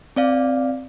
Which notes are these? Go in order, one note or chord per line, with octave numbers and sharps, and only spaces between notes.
C4 D5 F5